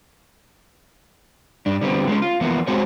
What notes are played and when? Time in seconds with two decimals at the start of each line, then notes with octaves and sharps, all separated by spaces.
1.66 G2 D4
1.81 D3 G3 B3 C4
2.08 G#3 B3 C#4
2.22 F4
2.41 E3 F3 A#3 B3
2.67 G#3 C4 F#4 G#4 C5 C#5